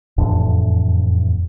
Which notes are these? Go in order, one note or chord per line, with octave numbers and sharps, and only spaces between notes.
F1 E2 A2 D4